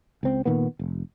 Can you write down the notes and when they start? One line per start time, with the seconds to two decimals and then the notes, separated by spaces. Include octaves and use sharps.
0.23 C#2 C4
0.45 A#2 D#3 A#3 B3
0.79 F1